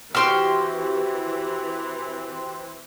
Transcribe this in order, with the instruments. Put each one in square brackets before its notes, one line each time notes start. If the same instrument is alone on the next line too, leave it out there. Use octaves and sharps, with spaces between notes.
[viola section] E3 [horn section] C4 [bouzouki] F#4 G4 G5 [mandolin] C6 F6